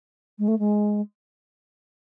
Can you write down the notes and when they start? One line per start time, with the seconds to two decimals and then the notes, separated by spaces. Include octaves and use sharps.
0.38 G#3
0.48 A3
0.59 G#3